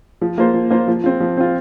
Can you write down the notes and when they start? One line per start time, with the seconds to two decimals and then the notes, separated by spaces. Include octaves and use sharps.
0.21 F3
0.38 A#3 F4 C5
0.54 F3
0.70 A#3 F4 C5
0.88 F3
1.04 C4 F4
1.20 F3
1.37 C4 F4